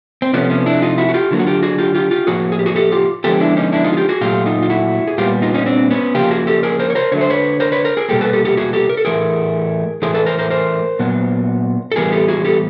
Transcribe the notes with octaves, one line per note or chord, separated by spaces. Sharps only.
C4
C3 F3 A3 B3 C#4
B3 C#4
D4 E4
D#4 F4
E4 F#4
F#4
F4 G4
D3 F#3 A#3 F4
F#4
F4 G4
F#4 G#4
F4 G4
F4 G4
F4 G4
A2 F3 A#3 F#4 G#4
G#4
G4
F#4 G#4
G4 A4
F4 G4
D3 F3 G#3 B3 G4 A4
D4 E4
C#4 D#4
D4 E4
D#4 F4
G#4
F4 G4
F#4 G#4
A#2 F#3 A3 F4 G4
D#4 F4
F4
E4 F#4
G#4
A#2 G3 B3 F4 G4
D#4 F4
C#4 D#4
C4 D4
B3 C#4
C#3 F3 A#3 F4 G4
F#4 G#4
G4 A4
G#4 A#4
A#4 C5
C#5
A#4 C5
D3 F#3 A3 C#5
C5
B4 C#5
A#4 C5
B4 C#5
A#4 C5
G#4 A#4
B2 G3 A#3 G4 A4
A4 B4
G4 A4
G4 A4
F#4 G#4
G4 A4
A#4
A4
A2 E3 A3 G#4 A#4
A2 E3 A3 G#4 A#4
A4 B4
A#4 C5
A#4 C5
A#4 C5
A#2 F#3 B3
A4
A2 E3 G3 B3 G#4 A#4
G4 A4
F#4 G#4
G4 A4